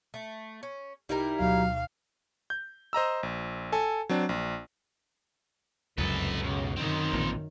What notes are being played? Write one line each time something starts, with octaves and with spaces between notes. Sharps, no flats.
A3
C#4
C2 G3 D#4 E4 A#4
D2 B2 F#3 F5
G6
C5 D#5 A#5 E6
A#1
A4 G#5
F#3 C4 D4
A#1
F1 C#2 F#2 A4 B4
B1 C#3
F#2 D#3 C4 D#4
A1 A#2